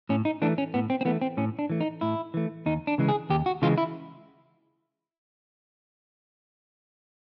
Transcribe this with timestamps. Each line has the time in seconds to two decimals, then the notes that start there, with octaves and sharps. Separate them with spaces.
0.09 A2 C#4
0.25 D#4
0.42 E3 A3 D4
0.58 C#4
0.74 A2 B3
0.90 C4
1.01 C4
1.05 E3 A3 B3
1.22 C4
1.37 A2 C#4
1.59 D4
1.70 E3 A3
1.81 D#4
2.01 A2 E4
2.34 E3 A3
2.66 D#2 D#4
2.87 D4
2.98 C#3 E3 G#3
3.09 G#4
3.30 D#2 G4
3.46 F#4
3.62 C#3 E3 G#3 F4
3.78 E4